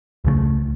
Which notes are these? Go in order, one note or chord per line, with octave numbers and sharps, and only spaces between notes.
C#2 C#3 E3 A3